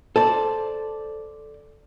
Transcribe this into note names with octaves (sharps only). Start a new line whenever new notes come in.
A4 C5 D5